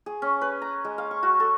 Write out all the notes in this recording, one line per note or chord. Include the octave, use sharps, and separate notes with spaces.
G#4
C#4
B4
A#5
G#3
F5
C#6
F#4
A4